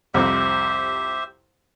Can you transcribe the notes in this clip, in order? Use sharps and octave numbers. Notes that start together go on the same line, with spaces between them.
C2 F2 G4 C5 E5